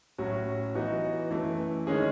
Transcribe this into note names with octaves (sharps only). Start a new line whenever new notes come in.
A2 F#3 C#4 F#4
E3 B3 D#4 F#4
F#2 E3 A3
D#3 G#3 C#4 G#4